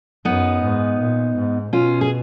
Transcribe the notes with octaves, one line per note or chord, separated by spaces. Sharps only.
F#2 B3 D#4
G#2
A#2
G#2
B2 C#4 F4
G#4